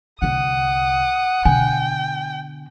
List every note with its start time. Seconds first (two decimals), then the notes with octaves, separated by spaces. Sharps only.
0.22 C2 D3 F#5 D#6
1.45 B2 D3 G5 G#5